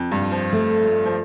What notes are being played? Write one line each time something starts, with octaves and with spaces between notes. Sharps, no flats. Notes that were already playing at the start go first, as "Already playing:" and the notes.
Already playing: F2
G2
F4
F3
A3
F4
F3